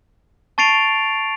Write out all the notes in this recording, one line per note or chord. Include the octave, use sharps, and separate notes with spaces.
A5 C#6 A6 C7 D7 F7